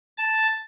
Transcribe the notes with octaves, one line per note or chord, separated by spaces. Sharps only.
A5